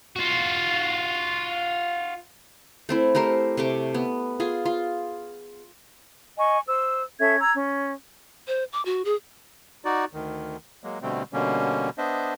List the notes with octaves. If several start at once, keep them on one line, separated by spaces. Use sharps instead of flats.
F4 F#4
A3 C4 E4
A3 G4 A#4 C5
C3 A3 C#6 D6
B3
F4 G#4
F4
D#5 G#5 C#6
C5 E6
C#4 A4 E5 G#6
A#5 E6 G#6
C#4
C5
D6
F#4
G#4
D#4 F#4 D5
D2 D#3
F#3 G#3 A#3
B2 D3 G3 A3 C4
B2 D3 G3 A#3 C#4
B3 D4 C5 D#5 E5